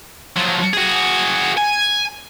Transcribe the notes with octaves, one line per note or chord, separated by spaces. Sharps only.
F3 F#3
F#4 G#4
G#5